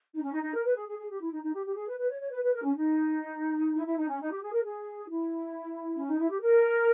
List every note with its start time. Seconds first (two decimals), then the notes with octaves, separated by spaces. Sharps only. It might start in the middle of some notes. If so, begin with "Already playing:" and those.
0.15 D#4
0.22 C#4
0.33 D#4
0.43 D#4
0.54 A#4
0.65 B4
0.76 G#4
0.88 G#4
0.99 G#4
1.10 G4
1.21 E4
1.32 D#4
1.43 D#4
1.54 G4
1.65 G4
1.76 G#4
1.88 B4
1.98 B4
2.10 C#5
2.20 C#5
2.31 B4
2.43 B4
2.54 A#4
2.64 C#4
2.76 D#4
3.76 E4
3.86 E4
3.98 D#4
4.09 C#4
4.20 D#4
4.31 G4
4.42 G#4
4.53 A#4
4.64 G#4
5.09 E4
5.96 C#4
6.08 D#4
6.19 E4
6.30 G4
6.41 A#4